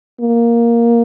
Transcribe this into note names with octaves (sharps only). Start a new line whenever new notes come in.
A#3